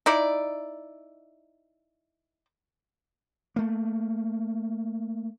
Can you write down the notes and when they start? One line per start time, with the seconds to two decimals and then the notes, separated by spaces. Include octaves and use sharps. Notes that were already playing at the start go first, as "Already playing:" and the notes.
0.06 D#4 E4 D5
3.56 A3 A#3